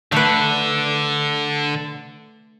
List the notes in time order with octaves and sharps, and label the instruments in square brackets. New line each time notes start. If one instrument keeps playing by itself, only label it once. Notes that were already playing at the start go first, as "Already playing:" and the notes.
[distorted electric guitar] D3 [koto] A3 B4